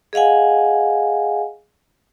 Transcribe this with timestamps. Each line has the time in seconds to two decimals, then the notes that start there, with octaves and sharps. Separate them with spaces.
0.13 G#4 D#5 F5 F#5 G#5